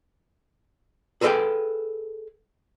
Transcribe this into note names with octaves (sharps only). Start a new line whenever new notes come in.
G#4 A4 B4 D#5 F5 G5